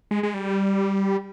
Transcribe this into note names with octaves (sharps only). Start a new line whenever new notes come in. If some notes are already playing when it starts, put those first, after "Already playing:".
G#3
G#3
G3